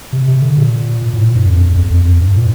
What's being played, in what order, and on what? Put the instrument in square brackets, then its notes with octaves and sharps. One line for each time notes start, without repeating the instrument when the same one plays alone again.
[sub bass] C3
C3
D3
A#2
A#2
A2
A#2
G2
F2
E2
F2
E2
F2
F2
G2
A#2